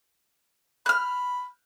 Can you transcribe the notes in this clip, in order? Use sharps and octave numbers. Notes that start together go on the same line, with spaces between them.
B5 F6 F#6